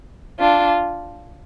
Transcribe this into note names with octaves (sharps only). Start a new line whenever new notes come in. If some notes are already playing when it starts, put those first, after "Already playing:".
D4 F4